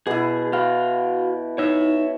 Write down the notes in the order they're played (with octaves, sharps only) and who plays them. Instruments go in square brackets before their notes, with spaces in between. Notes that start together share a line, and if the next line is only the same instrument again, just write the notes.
[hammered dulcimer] B2 E4 [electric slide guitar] G#4
[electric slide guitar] F#4 F5 [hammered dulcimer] G5
[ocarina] D#4 [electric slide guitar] C#5 E5